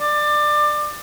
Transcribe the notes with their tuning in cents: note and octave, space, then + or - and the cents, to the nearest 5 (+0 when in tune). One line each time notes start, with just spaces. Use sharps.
D5 +25